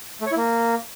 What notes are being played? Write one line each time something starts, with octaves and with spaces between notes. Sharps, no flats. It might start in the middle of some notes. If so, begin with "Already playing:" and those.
A3
C#5
E4
A#3